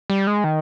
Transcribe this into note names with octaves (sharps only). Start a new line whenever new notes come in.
G3
G#3
D#3